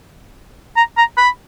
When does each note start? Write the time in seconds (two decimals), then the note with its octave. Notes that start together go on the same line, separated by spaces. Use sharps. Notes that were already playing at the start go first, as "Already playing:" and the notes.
0.76 A#5
0.97 A#5
1.17 B5